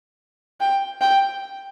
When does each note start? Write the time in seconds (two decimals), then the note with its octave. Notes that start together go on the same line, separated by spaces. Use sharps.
0.60 G5
1.01 G5